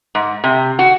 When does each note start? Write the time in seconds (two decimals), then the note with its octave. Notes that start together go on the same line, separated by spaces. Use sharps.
0.15 G#2
0.44 C3
0.79 F#4